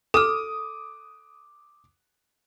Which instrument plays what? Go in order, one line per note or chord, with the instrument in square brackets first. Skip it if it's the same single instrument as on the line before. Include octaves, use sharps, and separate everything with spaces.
[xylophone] A4 F6 [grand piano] D6 D#6